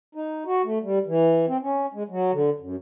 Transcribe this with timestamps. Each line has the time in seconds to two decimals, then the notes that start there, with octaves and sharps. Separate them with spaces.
0.15 D#4
0.46 F#4
0.64 A3
0.82 G3
1.07 E3
1.48 C4
1.63 C#4
1.94 G#3
2.09 F#3
2.33 D3
2.60 F#2